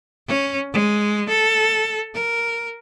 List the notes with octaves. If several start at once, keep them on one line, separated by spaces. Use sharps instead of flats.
C#4
G#3
A4
A#4